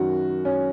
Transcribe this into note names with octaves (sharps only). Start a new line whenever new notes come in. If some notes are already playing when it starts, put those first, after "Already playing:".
Already playing: F#2 D#3 F#4
C#4